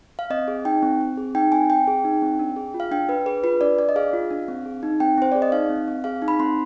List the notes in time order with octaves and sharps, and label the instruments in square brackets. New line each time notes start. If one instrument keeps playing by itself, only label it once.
[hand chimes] F5
C4 D#5
G#4
D#4 G5
C4
C4
G#4
D#4 G5
C4 G#5
C4 G5
G#4
D#4
C4
D4
G#4
F4
F5
D4 G5
D4 B4
G#4 B4
F4 B4
D4 D5
D4 D5
D#5
G#4 F5
F4
D4
C4
G#4
D#4
C4 G5
C4 C5
G#4 D5
D#5
D#4 F5
C4
C4
G#4 F5
D#4
B5
C4 C6